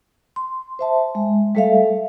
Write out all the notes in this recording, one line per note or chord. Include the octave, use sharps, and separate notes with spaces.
C6
C5 E5 A5
G#3
G3 A3 A4 E5 F5